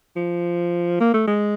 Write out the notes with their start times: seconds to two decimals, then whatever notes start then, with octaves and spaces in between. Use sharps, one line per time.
0.16 F3
1.00 A#3
1.14 A3
1.27 G#3